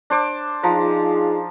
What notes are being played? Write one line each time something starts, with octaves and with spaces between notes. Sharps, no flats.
D4 C5 D6
F3 D#4 F4 G#4 A#5